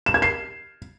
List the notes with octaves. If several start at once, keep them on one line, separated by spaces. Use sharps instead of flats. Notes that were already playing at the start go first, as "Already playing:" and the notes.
E7
G#6
C7